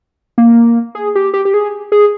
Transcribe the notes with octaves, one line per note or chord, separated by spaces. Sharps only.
A#3
G#4
G4
G4
G4
G#4
G#4